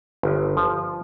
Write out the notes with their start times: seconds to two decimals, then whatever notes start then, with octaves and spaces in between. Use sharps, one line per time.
0.23 G1
0.57 F3